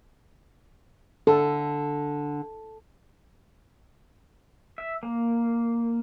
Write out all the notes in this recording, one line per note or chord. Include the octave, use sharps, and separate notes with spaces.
D3 A4
E5
A#3